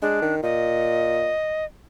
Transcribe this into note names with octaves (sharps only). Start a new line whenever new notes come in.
G#3 D4
D#3
A#2 D#5